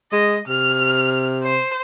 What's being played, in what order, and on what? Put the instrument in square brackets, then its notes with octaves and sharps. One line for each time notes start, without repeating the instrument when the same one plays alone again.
[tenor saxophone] G#3 [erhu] D#5
[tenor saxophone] C3 [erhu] F6
[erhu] C5